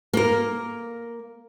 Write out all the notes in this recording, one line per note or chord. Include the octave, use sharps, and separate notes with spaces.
A#3 A#4